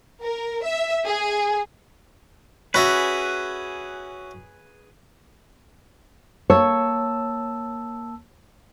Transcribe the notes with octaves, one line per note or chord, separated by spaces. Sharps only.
A#4
E5
G#4
C#4 F#4 G#4 B4 E5
A#3 C#5 A5 E6